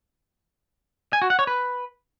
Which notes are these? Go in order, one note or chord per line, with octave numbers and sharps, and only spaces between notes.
G#5
F#4
F#5
C#5
B4